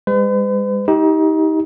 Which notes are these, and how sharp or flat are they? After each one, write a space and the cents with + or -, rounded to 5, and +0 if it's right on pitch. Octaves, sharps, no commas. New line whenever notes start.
G#3 -45 B4 +45
D#4 +30 G4 +0